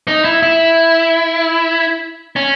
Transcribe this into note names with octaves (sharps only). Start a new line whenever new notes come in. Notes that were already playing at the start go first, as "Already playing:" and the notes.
D#4
E4
E4
C#4